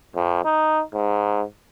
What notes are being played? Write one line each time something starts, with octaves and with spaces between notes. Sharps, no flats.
F2
D#4
G#2